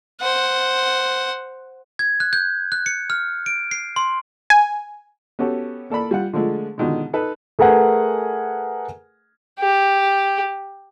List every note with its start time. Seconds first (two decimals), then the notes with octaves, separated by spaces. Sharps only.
0.21 C5 F#5
1.99 G#6
2.20 F#6
2.33 G6
2.72 F#6
2.86 C#7
3.10 F6
3.46 D7
3.71 C7
3.96 C6
4.50 G#5
5.39 B3 C#4 F#4 G4 A4
5.90 A#3 A4 D5 B5
6.11 G3 F4 F#5
6.33 D3 F3 G#3 A3
6.78 B2 D3 D#3 F3 G#3
7.13 D#4 A4 B4
7.59 A3 G#4 A#4 B4 F#5 G#5
9.60 G4